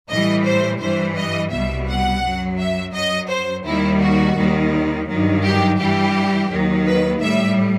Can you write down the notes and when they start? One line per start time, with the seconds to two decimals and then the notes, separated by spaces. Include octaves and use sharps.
0.09 A2 E3 G3 D#5
0.45 C5
0.80 G2 E3 G3 C5
1.16 D#5
1.51 C2 B2 G3 E5
1.88 F#5
2.23 F#2 F#3
2.59 E5
2.94 F#2 F#3 D#5
3.30 C5
3.65 D#2 D#3 G3 E4
4.01 F#4
4.37 D#2 D#3 G3
5.08 G2 D#3 F#3
5.44 G4
5.79 G2 E3 G3 G4
6.50 D#2 D#3 F#3
6.86 B4
7.21 A2 G3 E5